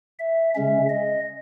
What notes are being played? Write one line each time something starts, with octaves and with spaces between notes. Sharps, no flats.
E5
C#3 G#3 C#4 E5
D#5